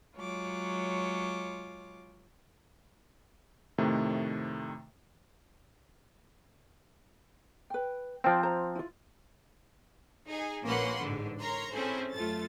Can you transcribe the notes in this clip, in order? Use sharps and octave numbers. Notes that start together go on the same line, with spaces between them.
F#3 G#3 F4 C#5 D6
F2 A2 C3 D#3 A3
B4 G5
F3 C4 G5 A5
C5 A#5
E4 F4
D#4 G#4
A#1 A#3 C#4 B4 F#5 C6
A1 G#2 D3
A#4 C#5 A#5 C6
C4 C#4 E4 G#4 A4 C5
F#2 A3 F4 A4 A6